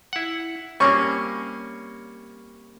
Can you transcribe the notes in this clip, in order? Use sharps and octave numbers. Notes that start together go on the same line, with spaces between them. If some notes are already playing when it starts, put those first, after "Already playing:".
E4 F#5
G3 A#3 C4 C#4 C#6